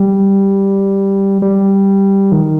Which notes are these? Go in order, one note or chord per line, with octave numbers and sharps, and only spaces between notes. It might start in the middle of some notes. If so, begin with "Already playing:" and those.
Already playing: G3
G3
D#3